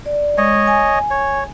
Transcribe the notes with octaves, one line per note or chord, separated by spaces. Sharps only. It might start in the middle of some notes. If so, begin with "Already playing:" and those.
D5
G#3 C#5 D#5
G#5
C#5